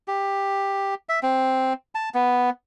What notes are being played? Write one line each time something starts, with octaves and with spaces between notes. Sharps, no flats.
G4
E5
C4
A5
B3